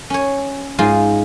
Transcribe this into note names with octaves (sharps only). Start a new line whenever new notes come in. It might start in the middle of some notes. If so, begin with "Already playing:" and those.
C#4 C#5
G#2 G#3 F4